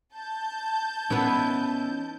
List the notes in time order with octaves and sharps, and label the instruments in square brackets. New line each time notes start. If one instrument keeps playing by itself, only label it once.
[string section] A5 G6
[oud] E3 B3 [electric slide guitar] C#4 D#4